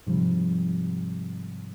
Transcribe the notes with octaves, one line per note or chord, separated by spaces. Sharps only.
G#2 C3 F3 G3